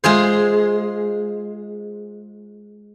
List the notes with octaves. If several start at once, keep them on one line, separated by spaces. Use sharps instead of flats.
G#3 F4 G#4 C5